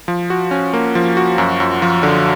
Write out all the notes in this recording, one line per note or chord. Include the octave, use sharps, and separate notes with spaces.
F3
F#4
C#4
A#3
F3
F#4
F#2
F#2
F3
D3